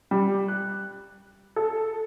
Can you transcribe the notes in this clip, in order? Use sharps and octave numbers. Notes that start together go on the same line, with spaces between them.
G3
F#6
A4